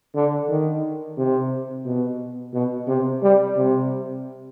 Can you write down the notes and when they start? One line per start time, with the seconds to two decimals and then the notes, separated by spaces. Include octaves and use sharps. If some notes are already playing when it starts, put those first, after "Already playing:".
0.15 D3
0.50 D#3
1.18 C3
1.86 B2
2.53 B2
2.88 C3
3.23 G3
3.57 C3